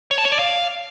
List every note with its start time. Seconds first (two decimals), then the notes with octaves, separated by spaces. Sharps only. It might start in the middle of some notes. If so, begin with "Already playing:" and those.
0.11 C#5
0.18 A5
0.25 C#5
0.32 D5
0.39 F5